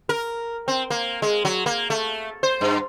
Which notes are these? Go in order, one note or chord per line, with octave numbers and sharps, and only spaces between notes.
A#4
C4
A#3
G#3
F#3
A#3
A3
C5
G2